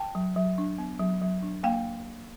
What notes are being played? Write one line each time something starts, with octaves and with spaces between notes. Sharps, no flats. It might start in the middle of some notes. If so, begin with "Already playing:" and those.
Already playing: G5 A5
F#3
F#3
D4
B3
F#3
F#3
D4
A#3 F5 G5